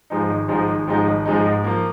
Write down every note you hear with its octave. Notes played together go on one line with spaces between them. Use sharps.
G#2 F3 G#3 D#4
G#1
G#2 F3 G#3 D#4
G#1
G#2 F3 G#3 D#4
G#1
G#2 F3 G#3 D#4
G#2
F3 A#3